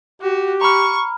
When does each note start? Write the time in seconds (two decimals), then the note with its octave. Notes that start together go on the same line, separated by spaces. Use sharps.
0.21 F#4 G4
0.61 A#5 B5 C#6 F6